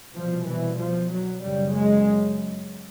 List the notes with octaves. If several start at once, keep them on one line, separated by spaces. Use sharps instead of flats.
C2 B2 F3
E3
F3
F#3
F#1 F#2 C#3 G3
G#3